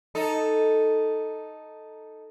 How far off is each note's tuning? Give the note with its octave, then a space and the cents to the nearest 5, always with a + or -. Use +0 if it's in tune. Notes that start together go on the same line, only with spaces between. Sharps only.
D#4 +0 A4 +0